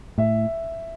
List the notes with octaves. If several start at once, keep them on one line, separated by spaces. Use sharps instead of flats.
A2 E5